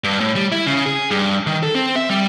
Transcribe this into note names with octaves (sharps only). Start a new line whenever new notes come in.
G2
A2
G3
E4
C#3
G#4
G2
D#3
A4
C4
E5
G3